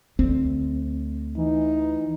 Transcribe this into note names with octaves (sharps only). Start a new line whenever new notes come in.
D2 C4
E3 D#4